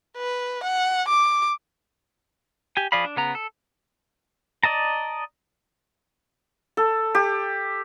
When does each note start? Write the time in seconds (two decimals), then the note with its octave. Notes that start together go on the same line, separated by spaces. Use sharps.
0.17 B4
0.63 F#5
1.08 D6
2.77 G4 G#5
2.92 F3 G#4 D5 F5 B5
3.05 D4
3.16 C#3 B3 A#5
3.35 A4
4.64 D5 D#5 A5 A#5
6.77 A4
7.15 G4